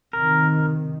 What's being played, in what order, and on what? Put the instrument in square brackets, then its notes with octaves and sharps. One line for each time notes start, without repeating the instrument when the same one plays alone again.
[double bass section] C3 D#3 [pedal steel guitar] A#4